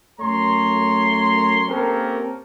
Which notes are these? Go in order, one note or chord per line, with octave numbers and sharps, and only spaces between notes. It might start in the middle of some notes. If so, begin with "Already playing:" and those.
F#2 A3 C#5 A#5 C6
A#3 C4 C#4 G4 A4 A#4